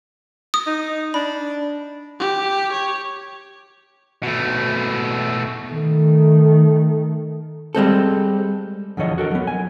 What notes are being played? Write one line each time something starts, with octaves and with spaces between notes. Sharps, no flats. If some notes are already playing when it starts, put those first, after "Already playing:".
D#6
D#4
D4 B5
G4
C#5
B2 A3
D#3 A3
G3 G#3 C4 A4
E2 D3 F3 C#5 D#5
F#4 A4 A#4
F#3 B3
G#5